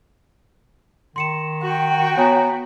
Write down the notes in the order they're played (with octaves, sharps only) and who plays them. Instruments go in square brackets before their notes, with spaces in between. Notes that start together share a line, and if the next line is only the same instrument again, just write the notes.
[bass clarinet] D#3 [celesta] C6 C#7 E7
[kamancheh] F#4 G5
[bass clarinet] B3 [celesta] C#5 G#5 A#5